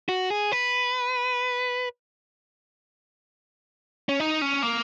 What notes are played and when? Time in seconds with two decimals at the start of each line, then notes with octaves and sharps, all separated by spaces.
0.09 F#4
0.30 G#4
0.52 B4
4.09 C#4
4.20 D#4
4.42 C#4
4.62 A#3